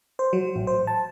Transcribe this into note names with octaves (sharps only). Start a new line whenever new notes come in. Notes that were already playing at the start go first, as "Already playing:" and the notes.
C5
F#3
A1
C5
A5